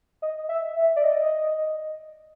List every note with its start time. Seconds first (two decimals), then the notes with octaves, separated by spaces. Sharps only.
0.22 D#5
0.49 E5
0.76 E5
0.96 D5
1.04 D#5